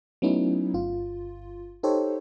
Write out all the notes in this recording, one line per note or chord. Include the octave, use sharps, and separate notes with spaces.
F#3 A3 B3 C#4 D#4 E4
G1 F4
D#4 G4 A4 C5 C#5